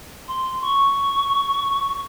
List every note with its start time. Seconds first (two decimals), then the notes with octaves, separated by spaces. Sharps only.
0.28 C6
0.62 C#6